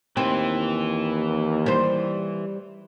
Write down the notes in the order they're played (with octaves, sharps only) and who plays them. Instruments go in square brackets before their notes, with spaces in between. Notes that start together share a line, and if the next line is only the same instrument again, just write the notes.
[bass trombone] D#2 [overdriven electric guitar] E3 [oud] C4
[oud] G3 C5